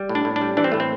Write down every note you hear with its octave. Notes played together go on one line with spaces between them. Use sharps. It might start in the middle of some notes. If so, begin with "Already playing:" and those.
Already playing: G3
A2
D4
A2
D4
G3
E3 D4
C4
A2 A3
C4